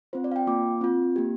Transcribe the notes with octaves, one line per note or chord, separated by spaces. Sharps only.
C4 F4 C5
D5
F5
G5
A#3 F4 D6
C4 F4
A#3 G4